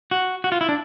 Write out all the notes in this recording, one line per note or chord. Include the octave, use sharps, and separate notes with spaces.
F#4
F#4
F4
E4
D4